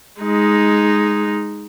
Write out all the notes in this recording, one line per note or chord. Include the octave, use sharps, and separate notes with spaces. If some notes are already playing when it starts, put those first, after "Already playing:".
G#3 D#4